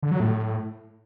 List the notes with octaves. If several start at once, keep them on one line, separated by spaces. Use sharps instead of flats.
D3
F#3
A2